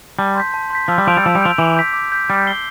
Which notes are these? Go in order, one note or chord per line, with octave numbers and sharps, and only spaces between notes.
G3 A5
C6 G6 B6
A5
C6 G6 B6
F3 E6
G3
F3 G6 D7 F7
G3
F3 E6
G3
F3 G6 D7 F7
E3 D6
G6 B6
D6
G6 B6
G3 G6
C7 G7